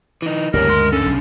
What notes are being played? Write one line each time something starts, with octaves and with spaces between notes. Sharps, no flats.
E3 D#4
D2 G2 C#3 G3 C#4 A#4
G#3 C6
D3 C#4 A4
B1 C3